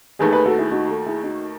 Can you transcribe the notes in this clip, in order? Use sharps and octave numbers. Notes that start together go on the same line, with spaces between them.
D#2 D#3 A3 G#4 B4
G#4 B4
F#4 A4
E4 G#4
D#4 F#4
F#4 A4
E4 G#4
D#4 F#4